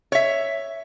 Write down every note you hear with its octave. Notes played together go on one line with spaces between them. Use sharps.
C#5 E5